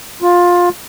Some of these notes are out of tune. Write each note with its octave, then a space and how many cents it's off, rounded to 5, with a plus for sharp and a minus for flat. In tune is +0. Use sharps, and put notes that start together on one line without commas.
F4 +15